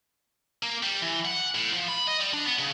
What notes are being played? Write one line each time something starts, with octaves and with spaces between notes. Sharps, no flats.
A#3
G3
E3
F#5
A2
F3
B5
D#5
G3
D4
B3
C#3